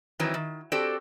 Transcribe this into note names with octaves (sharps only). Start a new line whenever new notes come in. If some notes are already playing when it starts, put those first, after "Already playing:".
D#3 E3 F#3 C4 D#4
D#3
C4 F#4 G4 A4 C5 D5